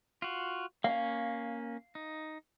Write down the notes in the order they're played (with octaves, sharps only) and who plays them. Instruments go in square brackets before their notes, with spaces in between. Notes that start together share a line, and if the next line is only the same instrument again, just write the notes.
[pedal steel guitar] F4 F#4
[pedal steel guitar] A#3 C#4 [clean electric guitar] F5
[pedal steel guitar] D#4